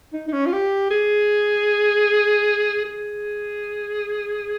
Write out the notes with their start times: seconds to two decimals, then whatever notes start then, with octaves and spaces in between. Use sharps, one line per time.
0.13 D#4
0.28 D#4
0.32 C#4
0.46 F4
0.53 G4
0.91 G#4
2.85 G#4